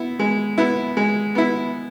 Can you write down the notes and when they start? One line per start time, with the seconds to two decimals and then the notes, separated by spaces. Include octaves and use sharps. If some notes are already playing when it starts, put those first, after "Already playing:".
Already playing: B3 E4
0.19 G#3
0.58 B3 E4
0.97 G#3
1.35 B3 E4